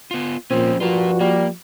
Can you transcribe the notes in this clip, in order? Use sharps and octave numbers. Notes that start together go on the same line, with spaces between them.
B3 F4
A#2 F3 C4 C#4
G2 F3 F4 F#4 A#4
G3 A#3